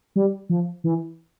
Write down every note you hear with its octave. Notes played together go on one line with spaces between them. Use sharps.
G3
F3
E3